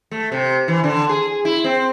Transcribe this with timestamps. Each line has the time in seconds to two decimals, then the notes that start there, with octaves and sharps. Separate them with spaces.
0.11 A3
0.32 C3
0.68 E3
0.84 D3
1.09 G#4
1.45 E4
1.64 C4